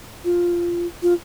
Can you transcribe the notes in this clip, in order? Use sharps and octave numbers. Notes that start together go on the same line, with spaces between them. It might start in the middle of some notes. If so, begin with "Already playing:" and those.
F4
F4